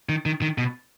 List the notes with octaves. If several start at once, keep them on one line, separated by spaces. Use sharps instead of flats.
D#3
D#3
D#3
B2